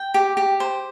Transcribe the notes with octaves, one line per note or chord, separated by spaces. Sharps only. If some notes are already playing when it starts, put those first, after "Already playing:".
Already playing: G5
G4
G4
C5